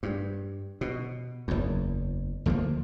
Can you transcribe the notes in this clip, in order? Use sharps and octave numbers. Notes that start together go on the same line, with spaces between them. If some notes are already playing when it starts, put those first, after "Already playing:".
G2
B2
F#1 E2
D2 F3 G3 A#3